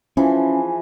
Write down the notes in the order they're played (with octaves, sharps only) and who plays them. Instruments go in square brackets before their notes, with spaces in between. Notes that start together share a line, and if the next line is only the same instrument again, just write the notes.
[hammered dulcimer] E3 F3 G#4 [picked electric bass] C#4